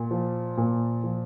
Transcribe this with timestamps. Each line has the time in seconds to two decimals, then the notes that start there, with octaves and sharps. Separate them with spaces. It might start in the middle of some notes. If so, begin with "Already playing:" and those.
Already playing: A#2
0.11 F3
0.57 A#2
1.04 F3